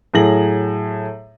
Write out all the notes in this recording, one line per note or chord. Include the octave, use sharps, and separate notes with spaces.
A2 F#3 G#4 A#6 F#7